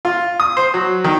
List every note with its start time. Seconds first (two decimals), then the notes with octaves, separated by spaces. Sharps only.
0.05 F4
0.40 D#6
0.57 C5
0.74 F#3
1.04 D#3